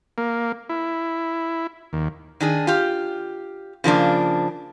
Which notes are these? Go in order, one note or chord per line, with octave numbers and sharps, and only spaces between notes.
A#3
E4
D#2
D#3 D4 G#4
F4 G4
C#3 F3 A#3 D4